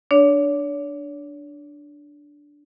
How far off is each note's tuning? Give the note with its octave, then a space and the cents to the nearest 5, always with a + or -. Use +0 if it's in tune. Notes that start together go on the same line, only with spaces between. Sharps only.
D4 +0 C#5 +40